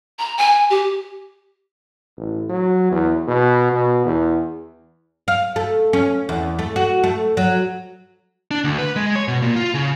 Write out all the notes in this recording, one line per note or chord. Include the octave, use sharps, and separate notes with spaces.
A#5
G#5
G4
A1
F#3
E2
B2
B2
E2
F5
A3
C#4
E2
A3
F#4
A3
F#3
D4
D2
B4
G#3
C#5
B2
A#2
F4
C#3